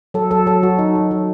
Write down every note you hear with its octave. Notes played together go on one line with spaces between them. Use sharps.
F#3 A4
F#3 A4
F#3 A4
F#3 F#4
D#4
F#3
F#3